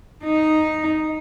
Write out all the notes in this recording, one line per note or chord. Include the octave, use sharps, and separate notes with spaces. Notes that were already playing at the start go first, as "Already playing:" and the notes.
D#4